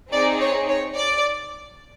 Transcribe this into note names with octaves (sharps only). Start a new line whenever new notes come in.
C4 D#4 G#4 D5
C#5
C#5
D5